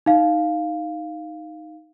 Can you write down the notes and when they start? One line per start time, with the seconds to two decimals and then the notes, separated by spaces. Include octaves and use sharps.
0.06 D#4 F5